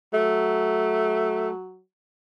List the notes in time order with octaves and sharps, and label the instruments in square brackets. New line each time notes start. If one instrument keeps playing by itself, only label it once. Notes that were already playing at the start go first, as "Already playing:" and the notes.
[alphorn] F#3 [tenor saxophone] A3